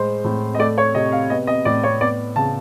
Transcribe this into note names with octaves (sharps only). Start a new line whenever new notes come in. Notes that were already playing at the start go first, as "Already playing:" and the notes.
Already playing: A2 G#3 C5
A2
D#5
A3 D5
C#5
C3 D#5
F5
B3 D#5
D#5
A2 D5
C#5
B3 D5
C#3 A5